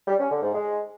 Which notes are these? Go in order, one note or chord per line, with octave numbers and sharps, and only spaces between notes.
G3
C#4
D3
G#2
G#3